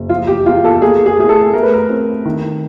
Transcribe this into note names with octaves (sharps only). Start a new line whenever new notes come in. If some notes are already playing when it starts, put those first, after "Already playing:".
Already playing: F#1
F3 F4
G4
E2 F4
A4
A#3 G#4
G#4
A2 G#4
A4
A3 A#4
B4
A#4
C4
D#3